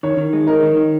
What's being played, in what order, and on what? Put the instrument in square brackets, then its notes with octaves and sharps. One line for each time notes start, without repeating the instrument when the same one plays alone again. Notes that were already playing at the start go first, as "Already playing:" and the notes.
[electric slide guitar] D#3 [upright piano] C#5
[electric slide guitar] D#3
G#3
[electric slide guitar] D#4 [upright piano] A#4
[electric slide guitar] D#3
D#3